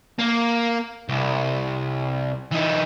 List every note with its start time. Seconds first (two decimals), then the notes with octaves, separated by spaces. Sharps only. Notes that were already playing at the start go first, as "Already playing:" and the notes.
0.19 A#3
1.09 C2
2.52 E3 D#4